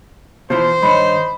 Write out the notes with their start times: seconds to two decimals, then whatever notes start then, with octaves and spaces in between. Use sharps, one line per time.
0.50 B2 E3 F3 C5
0.82 G2 D#3 D#4 C#5 B5